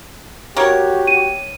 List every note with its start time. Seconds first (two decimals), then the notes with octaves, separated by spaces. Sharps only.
0.57 A#3 F#4 G4 A#4 C#5
1.07 D#7